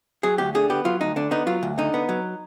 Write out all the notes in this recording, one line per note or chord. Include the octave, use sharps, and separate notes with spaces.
F#3 G#4
D2 G4
D3 G#4
B3 G4
F#3 F4
D2 D#4
D3 D4
B3 D#4
F#3 F4
D2
D3 D#4
B3
F#3